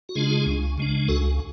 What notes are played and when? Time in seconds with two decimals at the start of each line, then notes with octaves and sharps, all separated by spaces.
0.09 F#4
0.15 C#3 G#3 D4 F4 G#4
0.46 C#2
0.78 C#3 G#3 D4
1.08 C#2 F#4 A4